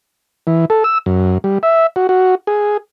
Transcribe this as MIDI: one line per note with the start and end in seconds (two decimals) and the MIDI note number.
0.47 0.65 52
0.70 0.84 69
0.84 0.98 88
1.06 1.38 42
1.44 1.58 55
1.63 1.87 76
1.96 2.07 66
2.09 2.35 66
2.47 2.77 68